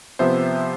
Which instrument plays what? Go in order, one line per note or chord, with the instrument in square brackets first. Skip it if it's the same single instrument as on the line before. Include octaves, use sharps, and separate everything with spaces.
[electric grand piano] C3 F3 B3 C5 E5